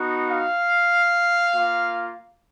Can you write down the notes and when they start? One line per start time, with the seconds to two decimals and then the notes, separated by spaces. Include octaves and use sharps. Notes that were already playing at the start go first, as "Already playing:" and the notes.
Already playing: B3 D#4 F#4
0.28 F5
1.55 A#3 F4